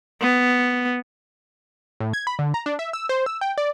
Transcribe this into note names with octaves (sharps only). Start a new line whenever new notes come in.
B3
A2
G#6
B5
D3
A#5
D4
E5
E6
C5
E6
G5
D5